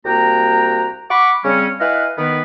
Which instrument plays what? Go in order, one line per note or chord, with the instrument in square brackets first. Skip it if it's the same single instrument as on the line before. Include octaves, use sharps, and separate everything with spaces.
[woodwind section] C2 A#3 F#4 G5 A#5
F#5 B5 C#6 D6
C#3 G3 C4 C#4
E4 B4 D#5 F5 F#5 G#5
D#3 B3 B4